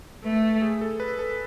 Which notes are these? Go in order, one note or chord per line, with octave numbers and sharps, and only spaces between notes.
A3 B4
A4
G#4
A4
B4
A4